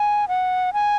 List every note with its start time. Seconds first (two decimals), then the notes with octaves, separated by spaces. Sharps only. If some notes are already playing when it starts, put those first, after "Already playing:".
Already playing: G#5
0.28 F#5
0.73 G#5